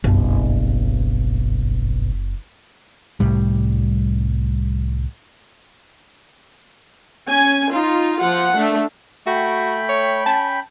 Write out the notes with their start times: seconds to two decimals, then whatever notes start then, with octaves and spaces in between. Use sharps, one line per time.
0.04 F#1 B1 G2 B2
3.20 C2 A2 G3
7.29 C#4 G#5
7.72 D#4 F4
8.20 F3 F4 F#5
8.56 A3 D4
9.27 A3 F#4 G5 B5
9.89 C#5
10.26 C#4 A5